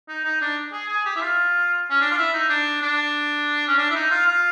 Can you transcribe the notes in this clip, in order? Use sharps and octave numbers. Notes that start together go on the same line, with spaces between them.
D#4
D#4
D4
G#4
G#4
G4
E4
F4
C#4
D4
F4
E4
D#4
D4
D4
C#4
D4
E4
D#4
F4
F4